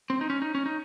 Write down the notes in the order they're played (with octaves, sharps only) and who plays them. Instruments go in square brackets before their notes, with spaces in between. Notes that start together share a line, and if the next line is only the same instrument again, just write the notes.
[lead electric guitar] C4
D#4
C#4
D#4
C#4
D#4